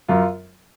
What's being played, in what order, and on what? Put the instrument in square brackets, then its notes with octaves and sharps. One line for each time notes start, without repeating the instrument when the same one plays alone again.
[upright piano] F#2 [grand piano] F4